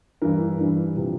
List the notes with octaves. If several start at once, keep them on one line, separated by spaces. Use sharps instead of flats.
G2 E3 A#4
G2 E3
C3 F3